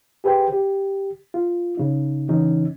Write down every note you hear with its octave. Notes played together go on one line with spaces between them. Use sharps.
G4 G#4 B4 C5 G5
G4
F4
C#3 D#4
C#3 E3 C#4 D#4